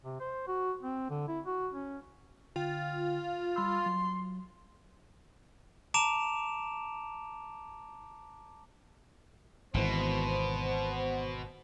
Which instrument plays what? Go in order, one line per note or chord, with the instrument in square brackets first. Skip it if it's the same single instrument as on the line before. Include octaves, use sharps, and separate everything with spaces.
[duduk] C3
C5
F#4
C4
D3
E4
F#4
C#4
[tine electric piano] D3 G5 [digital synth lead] F4
[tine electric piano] G3 B5 E6 [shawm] C6
[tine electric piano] F#3
[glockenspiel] A5 A#5 D6 D7 E7 F7
[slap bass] G#1 E3 [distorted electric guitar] B2 [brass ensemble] B3 C5